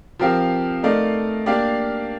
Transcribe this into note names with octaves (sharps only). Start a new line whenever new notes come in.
F3 C4 G4 A#4 F5
A3 D#4 A#4 D5 F5
A#3 D4 G4 D5 F5